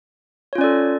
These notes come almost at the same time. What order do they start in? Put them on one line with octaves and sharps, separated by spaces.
C#5 F4 C#4 D5 A4